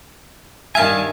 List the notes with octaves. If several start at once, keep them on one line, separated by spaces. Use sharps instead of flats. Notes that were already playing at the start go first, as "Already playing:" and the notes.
G2 D#3 E5 F5 G#5 A5